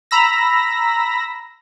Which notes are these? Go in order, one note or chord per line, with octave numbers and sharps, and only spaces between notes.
A#5 B5 E6 A#6